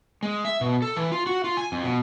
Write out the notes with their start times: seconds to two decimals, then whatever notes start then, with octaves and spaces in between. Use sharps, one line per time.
0.23 G#3
0.45 E5
0.61 B2
0.82 A4
0.96 E3
1.12 F4
1.27 F#4
1.44 F4
1.57 G#5
1.72 F2
1.84 B2